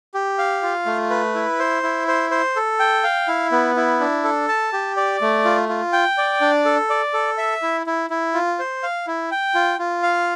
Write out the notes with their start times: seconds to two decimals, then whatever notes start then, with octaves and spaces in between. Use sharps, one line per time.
0.14 G4
0.38 F5
0.62 F4
0.86 A3
1.10 B4
1.35 E4
1.59 C5
1.83 E4
2.08 C5
2.31 C5
2.56 A4
2.80 G5
3.04 F5
3.28 E4
3.52 B3
3.76 E4
4.00 D4
4.24 A4
4.48 A5
4.73 G4
4.97 D5
5.21 A3
5.45 F4
5.69 F4
5.93 G5
6.18 D5
6.41 D4
6.65 A4
6.90 D5
7.14 A4
7.38 E5
7.62 E4
7.86 E4
8.10 E4
8.34 F4
8.59 C5
8.83 F5
9.07 E4
9.31 G5
9.54 F4
9.79 F4
10.03 F5